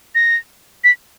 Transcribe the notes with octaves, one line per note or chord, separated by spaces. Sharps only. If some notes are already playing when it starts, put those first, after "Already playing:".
A#6
B6